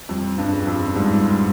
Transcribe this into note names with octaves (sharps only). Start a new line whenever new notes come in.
F2 G3
G2
C#4 G#4
F2
G#2 G3